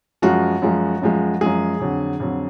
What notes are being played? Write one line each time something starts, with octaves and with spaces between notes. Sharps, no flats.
F#2 F3 G#3 F#4
F#2 F3 G#3
F#2 F3 G#3
F#2 F3 G#3 G#4
F2 D3 F#3
F2 D3 F#3